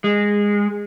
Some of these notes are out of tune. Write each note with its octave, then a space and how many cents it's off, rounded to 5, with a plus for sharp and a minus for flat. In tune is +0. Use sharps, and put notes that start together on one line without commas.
G#3 -15